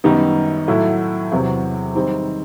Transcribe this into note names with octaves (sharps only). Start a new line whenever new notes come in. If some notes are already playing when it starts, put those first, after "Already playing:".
F#2 D#3 G3 B3 D#4
A2 F#3 A3 E4
E2 C3 F#3
D#3 G3 C4 D#4